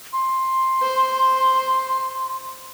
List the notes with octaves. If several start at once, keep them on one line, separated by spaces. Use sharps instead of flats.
C6
C5